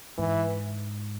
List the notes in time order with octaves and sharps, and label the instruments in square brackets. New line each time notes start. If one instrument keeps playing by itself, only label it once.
[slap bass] G#2 [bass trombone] E3